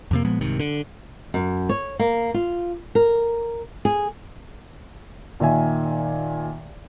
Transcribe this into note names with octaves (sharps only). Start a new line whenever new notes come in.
F2 C3 A#3
A#2 F3 G#3 B3
C2 G#2 C3 D#3
D3
F#2
C#5
A#3
F4
A#4
G#4
A#2 D#3 E5 G#5